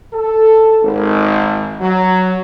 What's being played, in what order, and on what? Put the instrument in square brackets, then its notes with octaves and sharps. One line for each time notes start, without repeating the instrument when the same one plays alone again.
[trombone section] A4
G#1
F#3